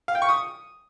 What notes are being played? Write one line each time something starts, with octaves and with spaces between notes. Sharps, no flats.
F5
G5
C#6
D#6